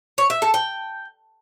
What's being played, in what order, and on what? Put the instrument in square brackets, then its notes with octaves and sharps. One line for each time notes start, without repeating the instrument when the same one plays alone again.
[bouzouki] C#5
E5
A4
G5